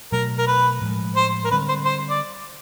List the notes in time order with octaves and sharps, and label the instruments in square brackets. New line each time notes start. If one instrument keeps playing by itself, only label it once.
[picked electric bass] B2 F#3 A3 [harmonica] A#4
[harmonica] A#4
B4
[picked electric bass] A2 F3 G#3
[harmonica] C5
A#4
[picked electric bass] D3 G3 C4 [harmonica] B4
[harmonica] C5
C5
D5